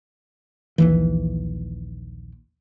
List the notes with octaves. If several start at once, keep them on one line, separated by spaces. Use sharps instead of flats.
A#1 D#2 E3